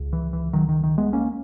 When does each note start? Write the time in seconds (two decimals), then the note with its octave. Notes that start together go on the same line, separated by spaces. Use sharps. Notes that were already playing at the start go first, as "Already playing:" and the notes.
Already playing: C#2 C#3
0.13 E3
0.33 E3
0.53 D#3 F#3
0.69 D#3
0.83 D#3
0.98 G#3 B3
1.13 A#3 C#4